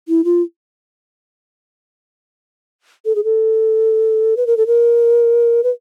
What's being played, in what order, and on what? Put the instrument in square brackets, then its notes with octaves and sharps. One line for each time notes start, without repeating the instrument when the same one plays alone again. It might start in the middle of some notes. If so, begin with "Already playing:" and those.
[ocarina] E4
F4
A4
G#4
A4
B4
A#4
A4
A#4
B4